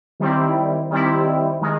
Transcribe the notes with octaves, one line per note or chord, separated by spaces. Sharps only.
D#3 G3 C4 E4
D#3 G3 C4 E4
D#3 G#3